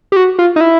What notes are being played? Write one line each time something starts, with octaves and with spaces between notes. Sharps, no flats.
G4
F#4
F4
D#4
E4